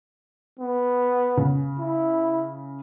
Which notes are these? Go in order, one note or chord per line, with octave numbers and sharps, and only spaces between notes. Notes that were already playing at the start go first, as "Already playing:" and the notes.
B3
C#3
E4